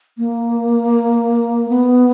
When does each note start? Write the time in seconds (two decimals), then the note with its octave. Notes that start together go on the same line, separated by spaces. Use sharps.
0.18 A#3
1.69 B3